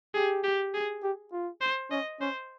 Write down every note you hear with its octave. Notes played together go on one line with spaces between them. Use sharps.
G4 G#4
G4
G#4
G4
F4
C5
C#4 D#5
C#4 C5